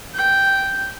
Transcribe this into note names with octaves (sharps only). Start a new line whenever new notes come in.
G5